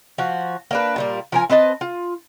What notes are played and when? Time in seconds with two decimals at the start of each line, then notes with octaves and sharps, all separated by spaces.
0.18 F3 F#4
0.71 A#3 D4 B4
0.96 A#2 G3 A#3
1.32 F3 A#4 G#5
1.50 C4 B4 D#5 A5
1.81 F4